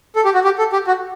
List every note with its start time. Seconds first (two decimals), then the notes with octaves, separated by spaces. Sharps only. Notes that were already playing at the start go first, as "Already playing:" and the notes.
0.16 A4
0.25 G4
0.34 F#4
0.44 G4
0.58 A4
0.73 G4
0.87 F#4